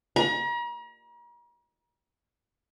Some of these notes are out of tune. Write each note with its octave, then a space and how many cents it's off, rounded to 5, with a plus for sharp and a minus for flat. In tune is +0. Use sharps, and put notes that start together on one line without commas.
A#5 +40